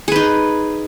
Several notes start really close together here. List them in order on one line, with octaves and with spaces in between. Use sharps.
G#4 B4 D#4